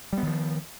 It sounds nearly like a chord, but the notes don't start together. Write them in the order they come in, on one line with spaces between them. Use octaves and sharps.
G3 B3 D#3 F3